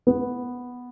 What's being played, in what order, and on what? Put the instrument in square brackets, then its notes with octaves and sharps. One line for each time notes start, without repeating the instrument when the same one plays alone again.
[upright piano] B3